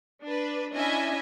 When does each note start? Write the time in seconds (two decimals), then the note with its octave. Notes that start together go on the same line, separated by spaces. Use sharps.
0.24 D4 B4
0.72 C#4 D4 E4 D#5 E5 G#5